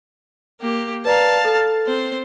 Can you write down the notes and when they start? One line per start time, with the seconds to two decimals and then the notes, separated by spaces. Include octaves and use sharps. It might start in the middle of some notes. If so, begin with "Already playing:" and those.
0.61 A#3 G4
1.05 B4 D5 F5 A5 A#5
1.45 A4 F6 A6
1.87 C4 C5